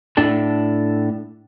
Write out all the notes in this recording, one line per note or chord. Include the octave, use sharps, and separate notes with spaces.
A2 D4 A4